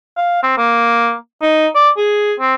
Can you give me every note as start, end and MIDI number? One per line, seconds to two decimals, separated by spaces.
0.17 0.40 77
0.43 0.53 60
0.57 1.14 58
1.42 1.67 63
1.75 1.90 74
1.97 2.33 68
2.40 2.55 60